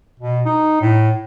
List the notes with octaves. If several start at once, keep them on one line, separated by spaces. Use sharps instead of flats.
B2
D#4
A2